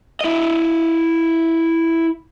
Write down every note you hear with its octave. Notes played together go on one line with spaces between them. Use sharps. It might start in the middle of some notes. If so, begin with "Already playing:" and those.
E4 D#5